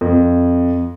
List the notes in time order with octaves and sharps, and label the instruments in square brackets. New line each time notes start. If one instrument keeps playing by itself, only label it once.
[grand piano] F2